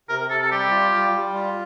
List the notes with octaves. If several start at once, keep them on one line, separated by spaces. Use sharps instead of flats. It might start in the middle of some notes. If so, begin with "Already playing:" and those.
C3 A#4
C3 A4
A4
G3 G4
F4
G3
G3
F4